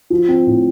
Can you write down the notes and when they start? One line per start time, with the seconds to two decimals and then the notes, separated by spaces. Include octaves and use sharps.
0.10 F3
0.28 C4
0.47 A2